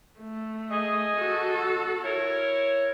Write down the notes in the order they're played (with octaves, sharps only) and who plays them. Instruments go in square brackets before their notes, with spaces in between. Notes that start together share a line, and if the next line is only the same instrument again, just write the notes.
[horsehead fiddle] A3
[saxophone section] G#4 D#5
[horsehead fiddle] F#4 A4
[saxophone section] E4 A#4 C#5